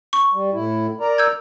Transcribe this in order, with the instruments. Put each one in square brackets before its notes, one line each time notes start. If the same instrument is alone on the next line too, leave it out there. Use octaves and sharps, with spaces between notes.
[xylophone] C#6
[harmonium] G3
A2 E4
A#4 D5 A#5
[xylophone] E6 G6 G#6